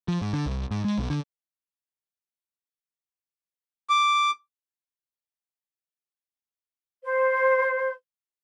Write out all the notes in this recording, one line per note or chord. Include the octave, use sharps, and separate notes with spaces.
F3
G#2
D3
C2
G#2
G#3
B1
D3
D6
C5